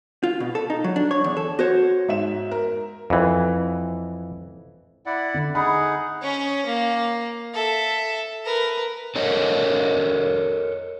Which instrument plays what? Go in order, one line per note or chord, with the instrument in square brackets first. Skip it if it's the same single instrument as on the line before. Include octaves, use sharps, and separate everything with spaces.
[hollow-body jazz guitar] F4
B2
A4
D#4
F#3
D4
C#5
E2
A4
[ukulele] F#4 C5 C#5
[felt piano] G#2 E5 E7
A#4
[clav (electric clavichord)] F2 E3
[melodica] E4 D5 F#5
[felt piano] D3
[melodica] D#4 G#4 F#5 [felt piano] B5
[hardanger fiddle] C#4 C#5
A#3
A4 E5
A#4 B4
[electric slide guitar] A4 A#4 C#5 D#5